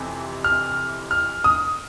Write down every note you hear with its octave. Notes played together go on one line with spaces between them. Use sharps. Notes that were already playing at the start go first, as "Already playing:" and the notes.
Already playing: F2 C3 E3
F6
F6
D#6